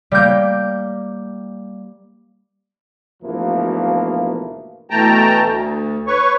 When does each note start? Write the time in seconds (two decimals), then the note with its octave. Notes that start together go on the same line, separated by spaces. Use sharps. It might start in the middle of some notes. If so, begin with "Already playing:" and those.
0.11 G3 A#3 G6
3.23 D2 G#2 B2 E3 F3 A#3
4.90 B2 E3 A3 G5 A5 A#5
5.44 D2
6.07 B4 C#5 C#6